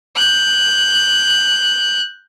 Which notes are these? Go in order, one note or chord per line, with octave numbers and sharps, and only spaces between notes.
F#6 G6